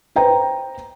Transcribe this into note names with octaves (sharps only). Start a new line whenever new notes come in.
B4 C5 G5 A#5